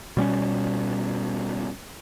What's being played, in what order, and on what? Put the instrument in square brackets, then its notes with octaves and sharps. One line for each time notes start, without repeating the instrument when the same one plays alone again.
[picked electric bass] B2 G3 C4 C#4